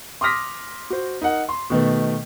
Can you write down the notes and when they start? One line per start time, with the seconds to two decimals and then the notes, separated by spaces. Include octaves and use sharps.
0.21 C6 D6 D#6 F6 A#6 B6
0.90 F#4 C5
1.22 D#4 A#4 F#5
1.49 C6
1.70 B2 D#3 A3 B3